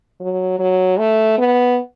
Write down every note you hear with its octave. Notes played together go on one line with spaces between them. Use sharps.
F#3
F#3
A3
B3